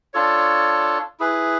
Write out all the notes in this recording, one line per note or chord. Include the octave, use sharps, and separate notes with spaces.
D4 F4 A4 C#5
E4 G#4 B4